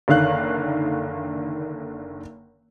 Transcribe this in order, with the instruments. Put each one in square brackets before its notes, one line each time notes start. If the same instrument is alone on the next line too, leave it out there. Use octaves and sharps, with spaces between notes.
[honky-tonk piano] F#1 D3 D#3 F5 F#6